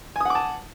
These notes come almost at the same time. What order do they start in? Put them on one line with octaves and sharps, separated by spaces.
G#5 D#6 F#5 D6 A5